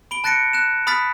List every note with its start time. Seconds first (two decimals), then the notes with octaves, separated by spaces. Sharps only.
0.11 B5 D7 G7
0.24 A5 F#6 A6 A#6 C#7 D7
0.53 F#6 E7
0.87 B5 D#6 F6 A6 B6